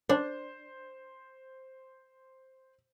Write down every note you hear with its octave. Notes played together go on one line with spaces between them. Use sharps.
D4 C5